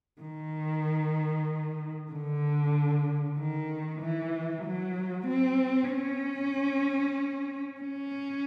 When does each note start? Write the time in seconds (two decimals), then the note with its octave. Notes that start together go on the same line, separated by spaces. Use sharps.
0.21 D#3
2.11 D3
3.38 D#3
4.02 E3
4.65 F#3
5.27 C4
5.90 C#4
7.81 C#4